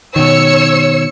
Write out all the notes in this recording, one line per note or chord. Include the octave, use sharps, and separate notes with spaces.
B2 D#3 C#5 E6 C#7